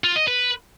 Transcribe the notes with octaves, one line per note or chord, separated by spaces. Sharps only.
F4
D#5
B4